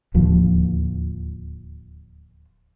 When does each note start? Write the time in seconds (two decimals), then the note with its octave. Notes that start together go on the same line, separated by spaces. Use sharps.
0.14 D1 D#2 F3